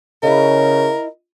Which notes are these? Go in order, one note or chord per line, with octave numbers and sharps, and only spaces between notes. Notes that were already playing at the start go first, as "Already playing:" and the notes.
C#3 E4 A#4 D#5